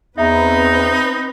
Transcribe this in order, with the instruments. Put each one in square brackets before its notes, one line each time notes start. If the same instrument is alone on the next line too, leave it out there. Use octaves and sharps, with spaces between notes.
[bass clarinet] E2 [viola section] C4 B4 [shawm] D#4 [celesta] E5 A#5